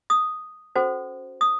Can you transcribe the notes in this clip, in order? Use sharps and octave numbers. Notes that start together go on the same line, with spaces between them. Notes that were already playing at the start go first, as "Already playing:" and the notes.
D#6
C#4 F#4 A4 C5
D#6